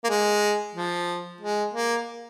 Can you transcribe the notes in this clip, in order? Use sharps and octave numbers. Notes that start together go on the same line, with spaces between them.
A#3
G#3
F3
G#3
A#3